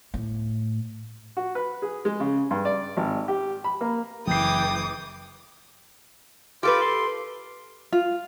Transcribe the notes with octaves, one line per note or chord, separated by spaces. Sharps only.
A2
F#4
B4
G#4
G#3
C#3
G2
D5
G#1
G4
B5
A#3
F#1 E3 G5 D6 D#6 C7
F4 G4 A4 B4 D6
C6
F4